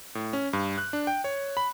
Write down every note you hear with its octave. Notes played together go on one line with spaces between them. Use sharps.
A2
C#4
G2
F#6
D4
G5
C#5
B5